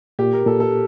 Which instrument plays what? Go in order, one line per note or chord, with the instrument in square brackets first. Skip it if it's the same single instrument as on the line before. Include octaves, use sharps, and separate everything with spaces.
[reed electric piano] A#2 [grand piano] G4
[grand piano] A#4
[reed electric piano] A#2 [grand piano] A4
[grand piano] A4